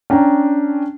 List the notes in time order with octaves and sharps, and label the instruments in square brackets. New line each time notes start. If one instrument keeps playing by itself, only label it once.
[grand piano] C#4 D4 G5 A#5